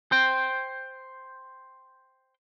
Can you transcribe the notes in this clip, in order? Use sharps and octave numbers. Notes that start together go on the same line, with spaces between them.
C5 G5